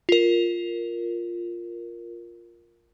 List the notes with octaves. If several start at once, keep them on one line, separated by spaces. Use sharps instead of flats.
F4 A#4